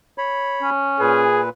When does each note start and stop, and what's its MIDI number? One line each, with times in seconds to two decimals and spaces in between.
0.18 0.70 73
0.18 0.70 83
0.62 1.22 61
1.00 1.49 46
1.00 1.41 68
1.00 1.49 71